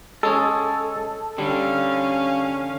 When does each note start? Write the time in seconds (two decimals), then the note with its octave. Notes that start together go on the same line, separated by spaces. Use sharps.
0.23 G#3 C#4 G#4 A4
1.38 D3 G3 C#4 F5